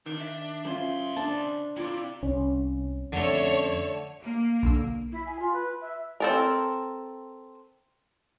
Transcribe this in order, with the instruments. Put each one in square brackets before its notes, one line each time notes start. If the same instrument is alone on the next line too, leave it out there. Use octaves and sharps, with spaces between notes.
[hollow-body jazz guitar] D#3 [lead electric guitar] D4 [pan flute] D#4
[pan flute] E5
[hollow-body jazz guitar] F#2 C#4 F4 [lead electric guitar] C#3 C6 [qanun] C5
[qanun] D4 C5 [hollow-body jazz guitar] A5
[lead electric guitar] C3 [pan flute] E4 [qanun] F4 D5
[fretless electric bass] C2 [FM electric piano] C#4
[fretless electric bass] F2 [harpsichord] D3 A3 [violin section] C#5
[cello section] A#3
[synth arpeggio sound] B1 D3 E6
[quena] E4
G#5
F4
B4
E5
[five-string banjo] C4 A4 A#4